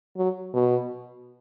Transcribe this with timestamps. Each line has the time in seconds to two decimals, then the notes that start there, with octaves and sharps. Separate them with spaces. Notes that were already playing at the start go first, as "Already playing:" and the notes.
0.17 F#3
0.54 B2